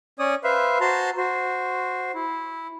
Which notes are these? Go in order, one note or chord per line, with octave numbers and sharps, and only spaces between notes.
C#4 C#5 D5 D#6
B4 C5 E5 F5
F#4 C5 A5 A#5 C6
F#4 C5
E4